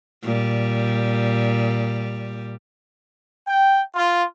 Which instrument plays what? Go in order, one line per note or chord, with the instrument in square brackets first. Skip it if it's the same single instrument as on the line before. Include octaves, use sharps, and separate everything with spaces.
[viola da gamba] A#2 G3
[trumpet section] G5
F4